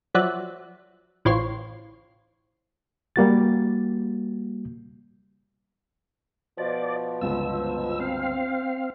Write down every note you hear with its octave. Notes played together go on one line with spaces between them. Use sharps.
F3 F#3 D5 E5 F#5 F#6
A1 E3 F4 C5 C#5 C7
G3 A#3 F#4 A6
B2 F3 D5
G1 C#2 E6
C4 F5